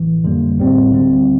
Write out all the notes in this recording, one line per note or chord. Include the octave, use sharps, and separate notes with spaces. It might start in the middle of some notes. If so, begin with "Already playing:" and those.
Already playing: A1 A2 E3
F2 D3 G3 A#3
A1 A2 G3 C4
D2 D3 G3 C4